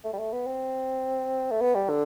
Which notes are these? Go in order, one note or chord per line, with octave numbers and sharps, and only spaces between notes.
A3
G3
A3
B3
C4
A3
B3
G3
D3